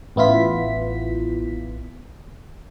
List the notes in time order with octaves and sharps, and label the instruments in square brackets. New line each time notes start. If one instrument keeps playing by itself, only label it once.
[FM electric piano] A1 B3 E4 F4 B6